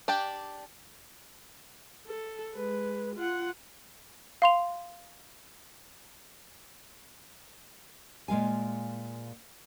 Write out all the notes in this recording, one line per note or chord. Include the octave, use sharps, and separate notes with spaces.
D4 G4 D5 G5
A4
G#3 B4
F4 F#5
F5 C6 F7
A#2 G#3 F5 G#5